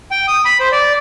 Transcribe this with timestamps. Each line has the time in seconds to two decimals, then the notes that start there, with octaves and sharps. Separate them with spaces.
0.11 G5
0.28 D#6
0.45 B5
0.60 C5
0.72 D5